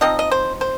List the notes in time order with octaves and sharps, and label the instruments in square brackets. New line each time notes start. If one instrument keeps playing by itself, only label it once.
[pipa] F3 C4 D#4 D#5
D#5
C5
C5